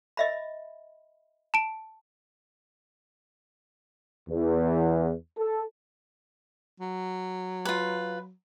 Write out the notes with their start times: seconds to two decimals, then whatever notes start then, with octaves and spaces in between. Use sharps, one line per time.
0.17 D#5 E5 B5
1.54 A5 D7
4.30 E2
5.38 A4
6.80 F#3
7.65 F4 B4